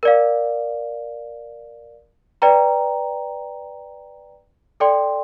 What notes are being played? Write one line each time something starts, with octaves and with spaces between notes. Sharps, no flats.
A#4 D5 F5
B4 D5 G5 A#5
A4 D5 G5 C6